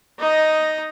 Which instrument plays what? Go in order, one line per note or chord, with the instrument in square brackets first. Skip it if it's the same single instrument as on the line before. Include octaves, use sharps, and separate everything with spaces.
[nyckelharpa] D#4 D#5